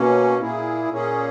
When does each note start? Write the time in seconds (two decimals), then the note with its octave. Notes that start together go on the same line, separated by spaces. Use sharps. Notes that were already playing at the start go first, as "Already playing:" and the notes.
Already playing: B2 A#3 C#4
0.40 A#2 A#3 E4 G#4
0.90 A#2 A#3 C#4 G#4